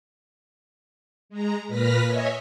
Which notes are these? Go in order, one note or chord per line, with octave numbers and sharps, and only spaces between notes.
G#3 A#5
A#2 B4 F6 A#6 B6
C#5 D#5 E5 G#5